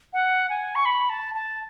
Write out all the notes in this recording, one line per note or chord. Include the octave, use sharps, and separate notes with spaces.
F#5
G#5
C#6
B5
A5
A5